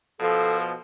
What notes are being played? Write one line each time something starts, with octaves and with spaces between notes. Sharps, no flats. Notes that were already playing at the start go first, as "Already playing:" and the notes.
B2 F3 A4